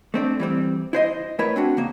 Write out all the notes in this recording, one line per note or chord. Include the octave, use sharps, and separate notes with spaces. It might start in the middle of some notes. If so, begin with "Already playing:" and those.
A3 C4 D4
E3 G3 C4
E4 C5 D#5
A3 E4 A#4 B4 C#5
C4 D4 F#4
C#3 A#3